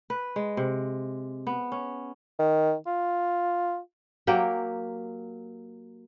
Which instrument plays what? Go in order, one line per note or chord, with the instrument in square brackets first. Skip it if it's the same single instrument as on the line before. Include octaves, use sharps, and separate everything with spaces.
[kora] B4
G#3
C3
B3
C#4
[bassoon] D#3
F4
[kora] F#3 A#3 G4